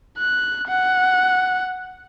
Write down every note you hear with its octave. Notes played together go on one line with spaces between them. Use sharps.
F#6
F#5